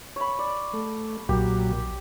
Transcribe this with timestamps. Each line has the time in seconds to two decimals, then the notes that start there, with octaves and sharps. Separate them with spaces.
0.16 C#5 B5
0.39 D5
0.73 A3
1.29 B1 A#2 F#3 G4